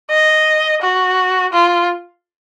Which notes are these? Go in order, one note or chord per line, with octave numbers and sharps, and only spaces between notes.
D#5
F#4
F4